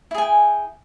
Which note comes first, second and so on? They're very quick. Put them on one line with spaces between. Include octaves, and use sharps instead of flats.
E4 G#4 G#5 G5